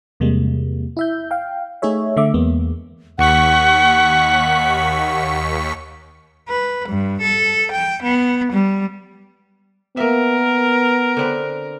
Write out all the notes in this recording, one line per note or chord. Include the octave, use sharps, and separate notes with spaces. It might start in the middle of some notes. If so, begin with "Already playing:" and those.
E2 C3 G3 G#3 A#3
E4 E5 G6
F5 G5
A3 D#4 G#4 C#5 E5
D3 A3 E5 D6
E2 G#3 A#3 B3
D#2 F#5 C#6 B6
B4
G2
A4
G5
B3
G3
A#3 B3 A#4 E5
D3 C4 B4